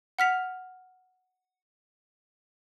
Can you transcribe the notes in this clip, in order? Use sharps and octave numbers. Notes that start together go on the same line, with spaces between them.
F#5 F6 B6 F7